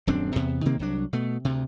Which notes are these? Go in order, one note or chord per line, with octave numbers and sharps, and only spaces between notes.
D#1 F#2 C4 D4
E2 C3 B3
C3 D#3 A#3 C4
C2 F#3 D4
B2 A3
D2 C3